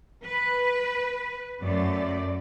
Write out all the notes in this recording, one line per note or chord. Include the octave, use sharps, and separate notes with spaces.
B4
F#2 A3 D5